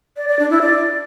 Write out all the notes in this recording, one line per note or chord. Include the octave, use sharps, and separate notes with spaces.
D5
D5
D4
E4
D5